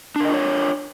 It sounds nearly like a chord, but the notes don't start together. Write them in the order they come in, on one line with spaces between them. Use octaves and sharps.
D4 A#4 D#5 F4 C#5